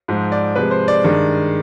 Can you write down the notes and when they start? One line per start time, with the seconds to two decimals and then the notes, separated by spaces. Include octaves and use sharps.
0.08 G#2 F3 G#3
0.32 D5
0.56 C3 F3 G#3 B4
0.71 C5
0.88 D5
1.04 G2 D#3 G#3